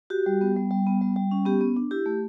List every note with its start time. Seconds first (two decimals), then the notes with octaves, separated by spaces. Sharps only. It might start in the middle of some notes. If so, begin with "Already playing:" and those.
0.10 F#4 G4
0.26 G3
0.41 B3
0.56 G3
0.71 G3
0.86 B3
1.01 G3
1.16 G3
1.31 C#4
1.46 B3 G4
1.61 B3
1.77 D4
1.91 E4 G4
2.06 A3